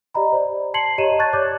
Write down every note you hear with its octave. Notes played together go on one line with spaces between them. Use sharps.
G4 D5 D#5 A#5 B5
C5 D5
A5 C6 G#6 C7 C#7 F#7
G4 C#5 D#5 A#5 D#7 E7
A5 C#6 F#6 G#6 A6
C#5 D5 D6 F#6 G6 A6